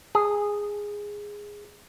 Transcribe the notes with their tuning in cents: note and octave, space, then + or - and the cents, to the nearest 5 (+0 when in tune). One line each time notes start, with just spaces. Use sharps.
G#4 -10